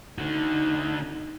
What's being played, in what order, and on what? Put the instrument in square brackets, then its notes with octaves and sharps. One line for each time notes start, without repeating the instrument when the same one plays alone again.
[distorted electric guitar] D3 F#4 [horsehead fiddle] D#4